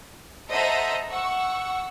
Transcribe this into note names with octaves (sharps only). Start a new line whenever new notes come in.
A4 C5 D#5 E5 F#5 A#5
F#5 C#6 E6